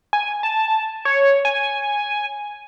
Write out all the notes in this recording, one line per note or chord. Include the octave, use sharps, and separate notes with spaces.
G#5
A5
C#5
G#5